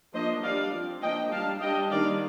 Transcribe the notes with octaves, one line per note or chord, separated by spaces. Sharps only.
F3 A#3 D4 C5 D#5
G3 D4 D5 F5
F3 C4
F3 A#3 D4 D#5 G5
G3 D4 F5 A5
G3 D4 D#5 G5
D#3 G3 A#3 D4 D5 F5